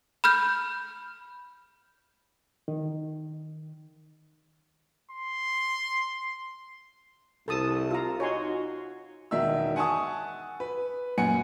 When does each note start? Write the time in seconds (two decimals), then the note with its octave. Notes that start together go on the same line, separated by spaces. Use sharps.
0.24 B5 F6 G6
2.68 D#3
5.11 C6
7.48 C2 A4 A5 D#6
7.91 F4 A#5
8.20 D#4 F#4 C#5 G#5 C6
9.31 E1 D#3 E5 E6
9.76 F#5 G#5 A5 C#6 D#6
10.60 B4
11.18 F#2 A#2 F#5 G#5 C#7